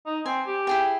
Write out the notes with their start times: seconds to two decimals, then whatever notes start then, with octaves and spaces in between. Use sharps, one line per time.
0.06 D#4
0.26 C4 G#5
0.47 G4
0.67 E4 G#4 G5